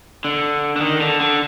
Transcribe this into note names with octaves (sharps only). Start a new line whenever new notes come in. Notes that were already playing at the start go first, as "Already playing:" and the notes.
D3
D3
D#3
D3
D3